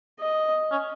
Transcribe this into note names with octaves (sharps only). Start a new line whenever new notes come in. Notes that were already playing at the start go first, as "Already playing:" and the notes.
D#5
C#4